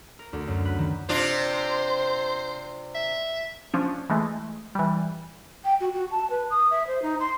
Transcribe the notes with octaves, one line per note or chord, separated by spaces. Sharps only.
A#4
D2
F#2
B4
D#3
C3 D4 F4 C5
E5
F3 C#4 D4
E3 G#3 A3
E3 G3
G5
F#4
F#4
A5
B4
D#6
E5
C5
D#4
C6